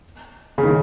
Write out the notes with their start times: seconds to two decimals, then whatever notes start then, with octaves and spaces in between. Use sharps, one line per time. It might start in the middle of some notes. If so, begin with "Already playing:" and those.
0.58 C#3
0.63 D#3